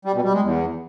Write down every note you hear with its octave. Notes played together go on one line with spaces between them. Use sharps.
G3
B2
G3
G#3
E2